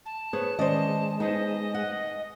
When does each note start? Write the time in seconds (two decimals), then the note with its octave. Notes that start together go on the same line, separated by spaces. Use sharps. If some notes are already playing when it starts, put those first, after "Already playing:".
0.05 A5
0.33 B3 G#4 C5 C#5
0.59 D#3 G#3 C#4 C5 D5 D#5
1.20 B3 D#4 G#4 C5 D#5
1.74 F#5